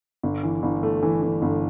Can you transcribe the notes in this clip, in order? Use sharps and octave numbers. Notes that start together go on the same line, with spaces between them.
G1
E3
G1
A3
E3
E3
G1